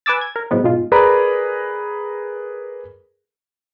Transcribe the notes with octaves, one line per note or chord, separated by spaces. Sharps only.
B4 G#5 D6 E6 A6
G#6
A#4
A2 F#3 G#3 B3 C4
G#2 B2 G#3 F4
G#4 A#4 B4 D5 A#5 B5